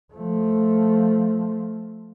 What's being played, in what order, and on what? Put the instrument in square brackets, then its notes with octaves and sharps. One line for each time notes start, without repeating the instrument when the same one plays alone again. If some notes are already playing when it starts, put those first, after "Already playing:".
[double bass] F3 A3